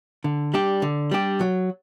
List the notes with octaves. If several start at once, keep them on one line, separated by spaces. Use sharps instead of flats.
D3
G3 D4 G4
D3
G3 D4 G4
F#3